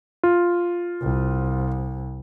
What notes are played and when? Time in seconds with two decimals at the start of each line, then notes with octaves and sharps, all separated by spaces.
0.23 F4
1.02 C2